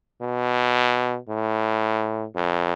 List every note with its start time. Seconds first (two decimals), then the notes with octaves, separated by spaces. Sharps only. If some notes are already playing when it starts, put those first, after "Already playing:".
0.22 B2
1.29 A2
2.36 F2